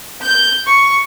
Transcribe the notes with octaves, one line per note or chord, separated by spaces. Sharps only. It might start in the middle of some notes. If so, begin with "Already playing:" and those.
G6
C#6